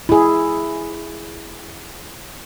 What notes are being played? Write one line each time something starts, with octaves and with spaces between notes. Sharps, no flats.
E4 G#4